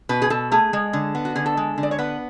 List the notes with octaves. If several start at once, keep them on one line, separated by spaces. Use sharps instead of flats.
B2 B4
G#4
B2 A4
A3 G#4
G#3
D3
B3
F#4
D3 G#4
A4
G#3
D3
D5
C#5
B3 B4